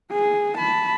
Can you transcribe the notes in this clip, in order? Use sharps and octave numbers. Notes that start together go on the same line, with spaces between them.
G#4
A5 B5